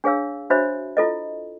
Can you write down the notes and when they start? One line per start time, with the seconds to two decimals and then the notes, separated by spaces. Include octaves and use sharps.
0.04 D4 G#4 C#5 F5 E6
0.50 D4 F#4 C5 C#5 E5 B5
0.97 E4 F4 A4 D#5